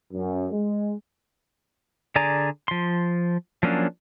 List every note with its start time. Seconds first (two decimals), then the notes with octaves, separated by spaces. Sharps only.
0.13 F#2
0.52 G#3
2.16 D3 G#4 D5 G#5 A#5
2.68 F3 C6
3.63 F3 F#3 A#3 C#4 D4